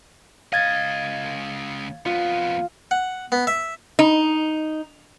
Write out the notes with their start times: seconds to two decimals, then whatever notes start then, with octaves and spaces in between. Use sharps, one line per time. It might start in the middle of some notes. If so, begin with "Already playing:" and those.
0.53 C#2 D#5 F5 G#6 A6
2.06 F2 B3 F4
2.91 F#5
3.32 B3
3.47 E5
3.99 D#4